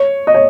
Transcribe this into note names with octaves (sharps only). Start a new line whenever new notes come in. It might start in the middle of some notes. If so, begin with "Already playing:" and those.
Already playing: C#5
D#5
C#5